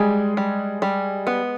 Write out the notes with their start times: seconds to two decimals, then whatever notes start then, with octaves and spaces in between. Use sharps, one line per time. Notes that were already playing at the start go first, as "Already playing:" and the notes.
Already playing: G3 G#3 G#4
0.37 G3
0.82 G3
1.27 B3